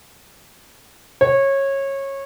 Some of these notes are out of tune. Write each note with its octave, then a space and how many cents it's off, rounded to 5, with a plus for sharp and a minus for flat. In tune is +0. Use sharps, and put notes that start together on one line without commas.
C#5 -20